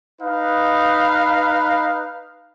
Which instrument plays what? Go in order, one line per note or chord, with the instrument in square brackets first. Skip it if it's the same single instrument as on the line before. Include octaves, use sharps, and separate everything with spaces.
[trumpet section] D#4 B4 F5